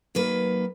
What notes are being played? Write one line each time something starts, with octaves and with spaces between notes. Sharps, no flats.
D#3 F#3 A#3 B4